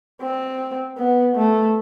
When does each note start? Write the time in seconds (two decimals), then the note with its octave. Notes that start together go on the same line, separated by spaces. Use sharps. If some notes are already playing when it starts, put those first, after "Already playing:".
0.22 C4
0.98 B3
1.36 A3